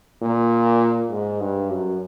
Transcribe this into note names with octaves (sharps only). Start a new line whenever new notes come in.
A#2
G#2
G2
F#2